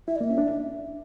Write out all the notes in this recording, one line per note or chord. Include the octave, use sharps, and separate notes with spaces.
E4 E5
D5
A#3 E5
C#4
D4